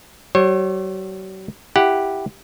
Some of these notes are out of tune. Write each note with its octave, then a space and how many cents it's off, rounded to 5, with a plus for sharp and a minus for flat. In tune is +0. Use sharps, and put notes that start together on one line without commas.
F#3 +45 C#5 -40
E4 +0 G4 +0 F#5 +0